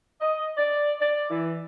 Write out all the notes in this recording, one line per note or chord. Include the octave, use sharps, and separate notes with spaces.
D#5
D5
D5
E3